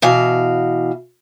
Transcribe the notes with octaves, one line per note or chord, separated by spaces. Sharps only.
B2 E3 F5